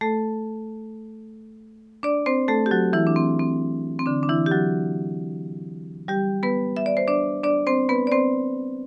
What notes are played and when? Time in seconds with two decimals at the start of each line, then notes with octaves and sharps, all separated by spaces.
0.01 A3 A4
2.03 D4 D5
2.26 C4 C5
2.48 A3 A4
2.66 G4
2.71 F#3 F#4
2.93 E3 E4
3.07 D4
3.16 C4
3.39 C4
3.99 C4
4.06 D3 D4
4.23 D4
4.29 E3 E4
4.46 G4
4.52 F#3 F#4
6.08 G3 G4
6.43 B3 B4
6.76 E5
6.86 D5
6.97 C5
7.08 D4 D5
7.43 D4 D5
7.67 C4 C5
7.89 B3 B4
8.07 D5
8.12 C4 C5